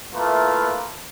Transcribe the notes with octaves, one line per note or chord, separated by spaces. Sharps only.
A3 A#3 E4 F4 B4